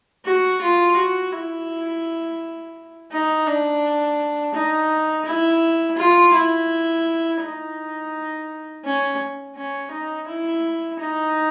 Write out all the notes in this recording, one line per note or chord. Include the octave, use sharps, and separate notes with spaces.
F#4
F4
F#4
E4
D#4
D4
D#4
E4
F4
E4
D#4
C#4
C#4
D#4
E4
D#4